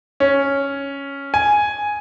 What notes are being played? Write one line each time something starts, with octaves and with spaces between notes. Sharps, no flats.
C#4
G#5